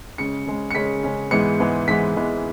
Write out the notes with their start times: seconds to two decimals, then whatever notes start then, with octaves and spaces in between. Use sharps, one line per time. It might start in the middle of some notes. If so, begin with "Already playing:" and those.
0.18 C#3 G#3 C#4 C#7
0.47 C#3 G#3 C#4
0.71 C#7
0.75 C#3 G#3 C#4 B6
1.03 C#3 G#3 C#4
1.31 G#2 E3 G#3 B3 C#7
1.60 G#2 E3 G#3 B3
1.88 G#2 E3 G#3 B3 B6
2.16 G#2 E3 G#3 B3